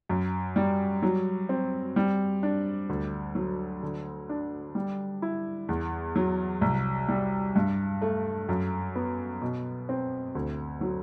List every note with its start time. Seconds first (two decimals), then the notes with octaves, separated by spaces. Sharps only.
0.09 F#2
0.56 G3
1.03 F#3
1.49 C4
1.96 G3
2.43 D4
2.89 D2
3.35 F#3
3.83 D3
4.29 D4
4.75 G3
5.22 E4
5.69 E2
6.16 F#3
6.61 C2
7.09 G3
7.56 G2
8.02 A3
8.49 F#2
8.96 B3
9.41 B2
9.89 C4
10.35 D2
10.81 F#3